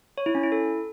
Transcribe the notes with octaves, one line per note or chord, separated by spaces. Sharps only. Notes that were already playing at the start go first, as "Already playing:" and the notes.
C#5
E4
C#4
E4
A4